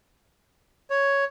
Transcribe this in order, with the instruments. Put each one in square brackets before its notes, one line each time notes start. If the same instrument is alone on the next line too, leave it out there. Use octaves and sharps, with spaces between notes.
[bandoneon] C#5